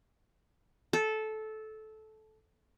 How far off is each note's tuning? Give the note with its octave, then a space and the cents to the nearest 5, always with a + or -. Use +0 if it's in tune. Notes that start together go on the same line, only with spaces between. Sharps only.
A4 -15